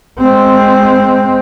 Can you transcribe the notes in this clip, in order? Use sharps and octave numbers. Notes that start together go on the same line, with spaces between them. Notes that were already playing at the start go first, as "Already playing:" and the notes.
G#3 C4